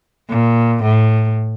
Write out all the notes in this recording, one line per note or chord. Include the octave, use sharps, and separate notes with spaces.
A#2
A2